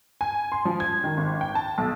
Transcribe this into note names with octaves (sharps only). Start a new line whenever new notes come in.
G#5
C6
F3
G#6
D#3
G#1
G5
A5
B1